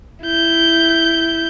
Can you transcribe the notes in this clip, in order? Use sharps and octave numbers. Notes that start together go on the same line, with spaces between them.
E4 G6